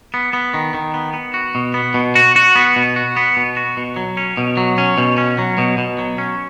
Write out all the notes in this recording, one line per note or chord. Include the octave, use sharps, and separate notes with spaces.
B3
B3
D#3
D#3
B3
B3
F#4
B2
B3
B2
F#4
F#4
B3
B2
F#4
B3
B2
F#4
B2
F#3
C#4
B2
F#3
C#4
B2
C#4
F#3
B2
B2
F#3
C#4